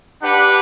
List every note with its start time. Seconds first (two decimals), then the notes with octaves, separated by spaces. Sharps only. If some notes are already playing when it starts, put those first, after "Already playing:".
0.21 D4 G4 B4 F#5